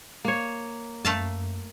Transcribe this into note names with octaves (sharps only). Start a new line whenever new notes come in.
A#3 C#5
F#2 A3 F5 A5